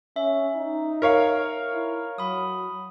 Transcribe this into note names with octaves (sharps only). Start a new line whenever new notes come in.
C#4 E5
D#4
A#4 C#5 F5
E4
F#3 B5 D#6